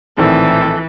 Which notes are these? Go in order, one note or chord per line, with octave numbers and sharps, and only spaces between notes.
A#1 A2 D#3 E3 C4 A4